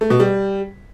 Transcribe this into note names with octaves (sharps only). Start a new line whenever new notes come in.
A3
B2
G3